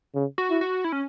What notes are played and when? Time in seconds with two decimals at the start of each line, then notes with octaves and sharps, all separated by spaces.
0.15 C#3
0.38 F#4
0.50 E4
0.61 F#4
0.84 E4
0.92 C#4